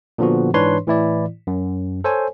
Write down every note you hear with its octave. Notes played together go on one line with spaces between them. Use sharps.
A#2 D3 F3 B3 F#4
G#2 E3 D4 B4 C#5 C6
A2 E3 E4 D5
F#2
A4 C5 C#5 G#5